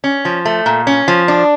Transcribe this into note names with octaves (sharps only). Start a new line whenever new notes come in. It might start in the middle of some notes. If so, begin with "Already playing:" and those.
C#4
F3
A3
A#2
C#4
F3
D4